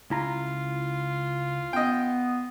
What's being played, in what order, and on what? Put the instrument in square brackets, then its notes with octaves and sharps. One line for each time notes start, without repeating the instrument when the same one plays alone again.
[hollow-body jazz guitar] C#2 E4 A#5 [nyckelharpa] F4
[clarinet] B3 [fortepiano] D#5 G5